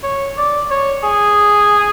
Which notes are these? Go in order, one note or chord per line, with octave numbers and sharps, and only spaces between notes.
C#5
D5
C#5
G#4